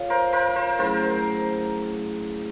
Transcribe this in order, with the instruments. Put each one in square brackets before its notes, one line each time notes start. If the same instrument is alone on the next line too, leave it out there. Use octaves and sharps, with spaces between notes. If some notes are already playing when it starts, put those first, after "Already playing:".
Already playing: [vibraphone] F4 A4 C#5 F5
[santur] A#4 C5
A#4 C5
A#4 C5
[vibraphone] F#3 A3 C#4 E4 G#4 [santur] A#4 C5